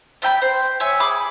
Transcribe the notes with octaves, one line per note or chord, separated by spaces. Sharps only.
D4 E5 G5 B5
C5
C#5 E5 G#5
G#4 B5 D6